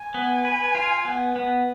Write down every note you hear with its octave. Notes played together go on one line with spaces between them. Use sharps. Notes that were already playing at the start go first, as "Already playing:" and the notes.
Already playing: G#5
B3
B4
F4
B3
B3